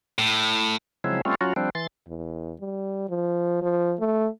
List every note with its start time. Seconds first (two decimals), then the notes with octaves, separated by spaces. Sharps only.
0.19 A2
1.04 C#3 F3 F#3 G#3 C4 E4
1.25 G3 A3 C4 C#4 F4
1.41 F#3 C#4 F4 F#4
1.56 F3 G3 C4 D4
1.75 E3 C6 A6
2.08 E2
2.60 G3
3.09 F3
3.62 F3
3.99 A3